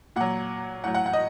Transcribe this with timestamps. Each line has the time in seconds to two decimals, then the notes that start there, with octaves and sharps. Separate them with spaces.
0.16 A#2 F#3 F#5
0.84 A2 F#3 F#5
0.94 F#5
1.06 F#5
1.13 D#5